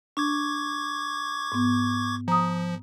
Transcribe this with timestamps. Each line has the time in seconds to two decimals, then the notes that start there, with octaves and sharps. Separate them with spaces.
0.17 D4 C#6 D6 G#6
1.52 G#2 B3
2.28 F3 A#5 D#6